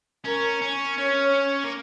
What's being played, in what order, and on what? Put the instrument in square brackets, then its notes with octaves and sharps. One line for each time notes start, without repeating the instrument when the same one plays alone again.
[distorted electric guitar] C#4 [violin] A#4
[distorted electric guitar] C#4
[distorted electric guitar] C#4 [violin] C#5
[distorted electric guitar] A#3